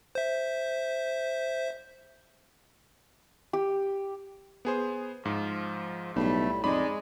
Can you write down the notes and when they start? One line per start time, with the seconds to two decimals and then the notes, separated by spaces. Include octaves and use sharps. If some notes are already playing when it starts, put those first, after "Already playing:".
0.15 C5 E5
3.53 G4
4.65 B3 G#4 C5
5.25 G#2 F3
6.16 B1 A2 G3 A3 B5
6.64 F2 G#3 D#4 G#4 D5 B5